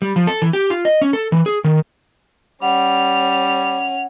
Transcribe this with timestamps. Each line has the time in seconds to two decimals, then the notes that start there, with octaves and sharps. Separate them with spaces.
0.02 G3
0.16 F3
0.27 A4
0.42 E3
0.53 G4
0.70 F4
0.85 D#5
1.02 C#4
1.13 A4
1.32 E3
1.46 G#4
1.64 D#3
2.62 G3 C#4 F#5 F7